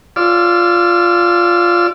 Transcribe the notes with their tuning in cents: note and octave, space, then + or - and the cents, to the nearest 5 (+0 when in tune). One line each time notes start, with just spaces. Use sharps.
F4 +0 D5 -10 E6 +30